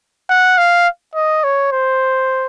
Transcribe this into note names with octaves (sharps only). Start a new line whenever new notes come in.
F#5
F5
D#5
C#5
C5